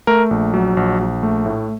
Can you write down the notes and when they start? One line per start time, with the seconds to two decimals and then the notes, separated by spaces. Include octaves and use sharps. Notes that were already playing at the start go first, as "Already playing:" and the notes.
0.07 A3 A#4
0.31 A#1
0.54 F#3
0.77 A#1
0.99 A#1
1.23 A3
1.46 A2